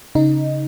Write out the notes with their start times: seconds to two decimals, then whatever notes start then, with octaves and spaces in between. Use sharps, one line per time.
0.15 C#3 D#4